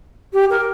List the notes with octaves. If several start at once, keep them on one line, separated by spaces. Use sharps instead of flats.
G4
A#4